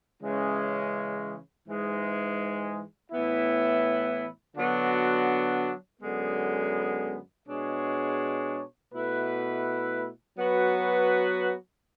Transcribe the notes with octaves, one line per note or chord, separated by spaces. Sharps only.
C#3 E3 G#3 C#4
G#2 E3 G#3
A2 E3 B3 E4
D3 F#3 B3 D4 F#4
F#2 D3 G#3 B3
B2 G#3 D4 G#4 C#5
B2 A3 E4 B4
F#3 B3 F#4 B4